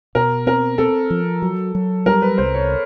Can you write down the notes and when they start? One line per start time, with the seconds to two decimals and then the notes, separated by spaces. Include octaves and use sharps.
0.15 B2 A#4
0.47 C4 A#4
0.78 C4 A4
1.10 F3
1.42 F#3
1.75 F#3
2.06 G3 A#4
2.22 B4
2.38 C2 C5
2.54 C#5